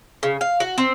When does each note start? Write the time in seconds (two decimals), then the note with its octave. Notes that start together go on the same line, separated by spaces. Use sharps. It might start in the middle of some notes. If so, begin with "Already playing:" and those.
0.23 C#3
0.41 F5
0.60 F#4
0.78 C4